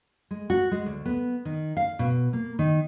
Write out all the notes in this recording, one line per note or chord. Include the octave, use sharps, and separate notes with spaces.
G#3
F#4
G#3
D2
B3
D#3
F5
B2
A#3
D#3